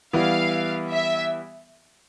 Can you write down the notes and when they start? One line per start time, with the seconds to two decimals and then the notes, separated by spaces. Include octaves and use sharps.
0.13 E3 G3 B3 E4 F5
0.92 E5